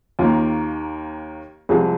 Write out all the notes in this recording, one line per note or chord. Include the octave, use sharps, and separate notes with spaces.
D#2 D#3 A#3 F4
C2 C3 F3 G#3 G#4